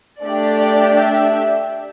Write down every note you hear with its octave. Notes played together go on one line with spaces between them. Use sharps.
A3 D4 G4 D5
E5